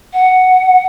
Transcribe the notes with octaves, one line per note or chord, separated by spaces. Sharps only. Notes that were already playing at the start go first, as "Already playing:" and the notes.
F#5